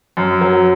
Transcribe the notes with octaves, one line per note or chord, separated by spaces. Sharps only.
F#2
F#3